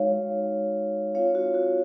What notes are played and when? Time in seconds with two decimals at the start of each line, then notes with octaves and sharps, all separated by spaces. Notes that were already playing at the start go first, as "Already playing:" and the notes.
Already playing: G#3 D#4 F#4 C#5 F5
1.15 C4 F4 C#5 F5
1.35 F#4
1.54 F#4